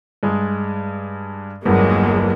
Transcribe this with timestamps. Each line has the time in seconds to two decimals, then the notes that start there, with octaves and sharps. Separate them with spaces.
0.23 G2 G#3
1.65 G1 E2 G2 F#3 G#3 A#3